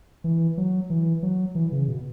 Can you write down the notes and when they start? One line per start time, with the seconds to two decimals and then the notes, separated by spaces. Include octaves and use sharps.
0.24 E3
0.58 F#3
0.90 E3
1.23 F#3
1.55 E3
1.72 C#3
1.88 B2